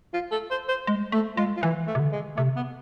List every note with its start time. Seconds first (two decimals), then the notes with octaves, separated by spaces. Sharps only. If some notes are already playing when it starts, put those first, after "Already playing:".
0.14 F4
0.32 A4
0.51 C5
0.69 C5
0.87 G#3
1.12 A3 A4
1.37 G#3 F4
1.57 F4
1.62 E3 E4
1.87 A3
1.95 C3
2.00 D3
2.12 G#3
2.37 C3 A3
2.56 B3